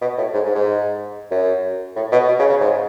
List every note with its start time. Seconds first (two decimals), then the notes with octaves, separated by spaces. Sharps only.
0.02 B2
0.18 A2
0.34 G#2
0.45 G#2
0.55 G#2
1.31 F#2
1.96 A2
2.12 B2
2.28 B2
2.39 C#3
2.50 C#3
2.60 G#2